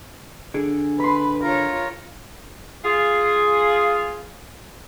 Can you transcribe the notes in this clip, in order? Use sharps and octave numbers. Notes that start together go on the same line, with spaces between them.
D3 G#4 D7
B4 B5 C6
F4 A#4 C#5
F4 G#4